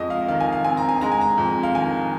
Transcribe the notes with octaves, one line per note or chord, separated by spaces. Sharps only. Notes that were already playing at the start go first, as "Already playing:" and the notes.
Already playing: F2 G#3 D#5
F5
D#3 F5
G#5
F5
C4 G#5
A#5
G#5
G#3 A#5
G#5
A#5
F2
F5
D#3 G#5